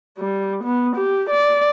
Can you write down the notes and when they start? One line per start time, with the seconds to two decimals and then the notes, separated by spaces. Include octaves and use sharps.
0.18 G3
0.64 B3
0.96 G4
1.30 D5